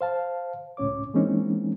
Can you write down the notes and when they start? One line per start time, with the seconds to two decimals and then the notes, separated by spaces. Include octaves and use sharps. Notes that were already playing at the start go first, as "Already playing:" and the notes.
0.01 C5 F5 A5
0.77 C#2 A2 C#4 C#5 D6
1.14 E3 G#3 A#3 C4 C#4 D#4